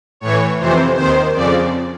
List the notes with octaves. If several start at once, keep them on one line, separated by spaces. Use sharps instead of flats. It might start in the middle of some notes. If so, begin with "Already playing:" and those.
A2 E3 C#5
F2 C3 E3 C5
D#2 D#3 C5
F2 C#3 F3 D5